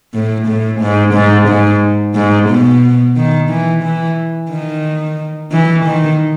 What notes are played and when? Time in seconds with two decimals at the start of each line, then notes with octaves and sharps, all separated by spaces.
0.14 A2
0.47 A2
0.80 G#2
1.14 G#2
1.48 G#2
2.15 G#2
2.49 B2
3.16 D#3
3.50 E3
3.83 E3
4.50 D#3
5.52 E3
5.85 D#3